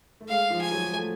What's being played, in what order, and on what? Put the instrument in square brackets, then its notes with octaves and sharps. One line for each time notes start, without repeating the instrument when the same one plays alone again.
[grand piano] A3
[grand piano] G#3 [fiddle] F5
[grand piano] F3
[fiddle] G#5
[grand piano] F#3
A3